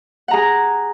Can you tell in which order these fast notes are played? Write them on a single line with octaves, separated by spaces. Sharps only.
F#5 A#5 G#4